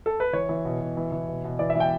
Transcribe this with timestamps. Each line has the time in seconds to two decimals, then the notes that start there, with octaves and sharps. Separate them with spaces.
0.06 A4
0.20 B4
0.33 E3 C#5
0.49 E3
0.65 B2
0.81 B2
0.97 E3
1.12 E3
1.28 B2
1.44 B2
1.59 E3 D5
1.70 E5
1.75 E3 G5